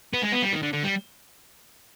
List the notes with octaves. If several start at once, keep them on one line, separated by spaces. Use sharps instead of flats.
B3
G#3
B3
G3
D#3
D3
D3
G3